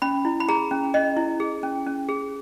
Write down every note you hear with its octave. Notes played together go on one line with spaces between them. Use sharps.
C#4 B5
E4
B5
G#4 A#5
C#4
C#4 D#5
E4
G#4
C#4
C#4
G#4